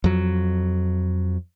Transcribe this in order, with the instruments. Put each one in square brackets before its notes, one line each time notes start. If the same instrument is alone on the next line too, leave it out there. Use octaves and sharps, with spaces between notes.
[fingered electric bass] F2 F#3